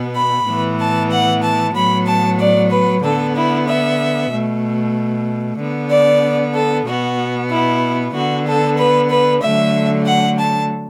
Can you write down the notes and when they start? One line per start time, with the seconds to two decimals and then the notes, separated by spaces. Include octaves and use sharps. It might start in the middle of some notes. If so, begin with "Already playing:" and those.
Already playing: B2 B3
0.15 B5
0.47 A2 E3 B3
0.79 A5
1.11 F#5
1.43 A5
1.75 A2 F#3 B3 B5
2.06 A5
2.39 D5
2.71 B4
3.02 D3 B3 A4
3.35 E4
3.67 E5
4.31 B2 A3
5.59 D3 B3
5.90 D5
6.54 A4
6.87 B2 B3 F#4
7.51 E4
8.14 D3 B3 F#4
8.47 A4
8.78 B4
9.11 B4
9.42 D3 F#3 A3 E5
10.06 F#5
10.38 A5